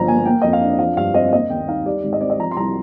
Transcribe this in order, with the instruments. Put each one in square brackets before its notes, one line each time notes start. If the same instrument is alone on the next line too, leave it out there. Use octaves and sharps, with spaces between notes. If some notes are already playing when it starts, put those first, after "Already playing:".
Already playing: [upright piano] G1 F3 A#5
A#3 G#5
A#3 G5
F2 D#5
F5
D4
F3 F5
G2 F5
C4 D#5
F5
A#3 D#5
D#2 G5
D#4 F5
G3 D5
G#1
D#5
C4 D5
D#5
F3 A#5
C6
C2 A#5